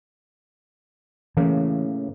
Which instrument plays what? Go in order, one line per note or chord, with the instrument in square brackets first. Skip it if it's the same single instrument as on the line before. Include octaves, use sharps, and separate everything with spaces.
[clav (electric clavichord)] A2 C#3 A#3 [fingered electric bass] E3